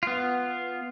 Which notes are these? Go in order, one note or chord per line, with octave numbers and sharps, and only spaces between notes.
B3 F4